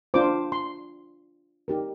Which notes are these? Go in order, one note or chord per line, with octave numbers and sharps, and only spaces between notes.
D4 F4 C5 D6
C6
D#4 G4 A#4